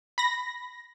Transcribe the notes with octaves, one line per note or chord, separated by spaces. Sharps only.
B5 A#6